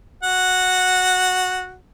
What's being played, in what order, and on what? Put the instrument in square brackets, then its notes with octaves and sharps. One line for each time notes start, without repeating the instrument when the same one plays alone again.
[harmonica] F#4 F#5